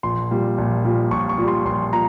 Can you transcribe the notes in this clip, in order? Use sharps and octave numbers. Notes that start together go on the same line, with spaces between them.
A#1 C6
A#2 G3
A#1
A#2 G3
A#1 C#6
C#6
A#2 G3
C6
A#1 C6
A#2 A#5